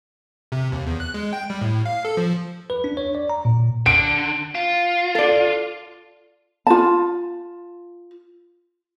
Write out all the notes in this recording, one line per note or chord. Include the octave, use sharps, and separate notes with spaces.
C3
D#2
E2
F#6
G#3
G5
G3
A2
F5
A4
F3
B4
D4
C#5
D5
A#5
A#2
D3 D7
F4
A4 D5
F4 A5